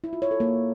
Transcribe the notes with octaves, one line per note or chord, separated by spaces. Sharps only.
E4
F4
C#5
A4
A#3